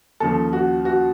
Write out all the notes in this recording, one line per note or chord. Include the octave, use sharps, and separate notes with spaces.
D#2 C#3 F3 A4
F#4
F#4